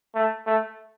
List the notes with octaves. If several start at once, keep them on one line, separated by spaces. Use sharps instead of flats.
A3
A3